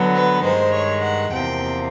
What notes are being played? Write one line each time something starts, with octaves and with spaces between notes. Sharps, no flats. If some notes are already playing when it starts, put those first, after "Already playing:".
Already playing: D3 F#3 B3
B4
G2 D#3 G#3 C5
C#5
F#5
E2 C3 F3 A#3 G5